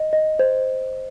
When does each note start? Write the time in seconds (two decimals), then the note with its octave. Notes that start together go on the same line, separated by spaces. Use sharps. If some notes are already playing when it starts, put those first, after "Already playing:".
Already playing: D#5
0.13 D#5
0.39 C5